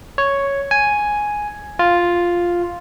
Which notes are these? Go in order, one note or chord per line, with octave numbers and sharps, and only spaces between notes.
C#5
G#5
F4